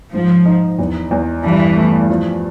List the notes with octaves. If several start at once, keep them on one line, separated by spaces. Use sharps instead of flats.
G#2 F3
D#4
E2
E2
G2 E3
A3
F3